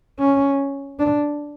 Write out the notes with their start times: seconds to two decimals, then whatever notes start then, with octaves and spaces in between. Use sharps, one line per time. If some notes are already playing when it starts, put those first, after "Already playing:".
0.19 C#4
0.99 D4